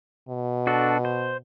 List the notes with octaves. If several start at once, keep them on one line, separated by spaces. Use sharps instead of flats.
B2
D4 F#4 A4
C5